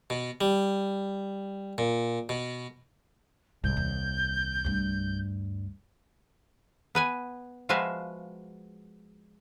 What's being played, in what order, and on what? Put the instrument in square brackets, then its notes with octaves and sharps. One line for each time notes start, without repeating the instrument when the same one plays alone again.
[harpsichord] B2
G3
A#2
B2
[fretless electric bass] C2 [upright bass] G#2 [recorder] G6
[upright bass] D#2
D2 G2
[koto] B3 B4 G#5
F3 G#3 F#4 B4 E5 F5